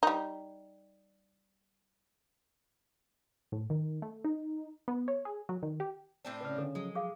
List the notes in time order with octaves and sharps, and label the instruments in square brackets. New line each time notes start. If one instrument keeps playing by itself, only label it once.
[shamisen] G3 D#4
[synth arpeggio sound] A2
D#3
A3
D#4
B3
C#5
G#4
F#3
D#3
G4
[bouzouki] A2 C4 D4
[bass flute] C#3 [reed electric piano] B4 D5 F6
[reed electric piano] D3 [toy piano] A4
[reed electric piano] F3 F#3 [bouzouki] G#3
[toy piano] G#4 F5